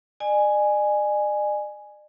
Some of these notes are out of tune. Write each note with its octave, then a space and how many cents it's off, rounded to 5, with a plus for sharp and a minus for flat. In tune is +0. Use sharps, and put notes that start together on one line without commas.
D5 +45 G#5 +0